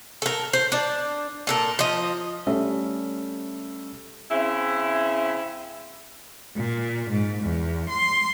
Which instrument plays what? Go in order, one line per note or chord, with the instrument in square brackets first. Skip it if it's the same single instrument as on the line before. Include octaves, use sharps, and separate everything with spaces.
[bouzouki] A4 A#4
C5
D4 D5
A#2 A4 A#4
F3 D#5
[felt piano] G3 A3 C#4 A4 E5
[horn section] C#3 C4 E4
[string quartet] A#2
G#2
E2
C6